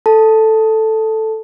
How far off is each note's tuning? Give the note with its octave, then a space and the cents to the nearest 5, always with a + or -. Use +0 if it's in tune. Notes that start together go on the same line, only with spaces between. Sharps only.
A4 +0 A5 +0